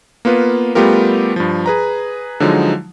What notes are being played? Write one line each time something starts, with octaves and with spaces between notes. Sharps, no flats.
A#3 B3 F4 B4
G3 A3 B3 F4 G4 A#4
G2 F3
G#4 B4 A#5
D3 F3 F#3 G#3 D#4